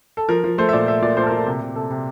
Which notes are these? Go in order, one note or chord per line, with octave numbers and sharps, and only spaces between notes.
A4
F3 A#4
F3
A3 C5
E5
A#2 D5
A3 E5
A#2 D5
A#2 C5
A4
A#4
A#2
A4
C3
C3
C3 A4
C3